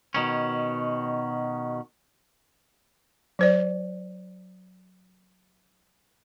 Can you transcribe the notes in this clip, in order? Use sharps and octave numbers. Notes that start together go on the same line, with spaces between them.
B2 D#3 C#4
F#3 C5 D5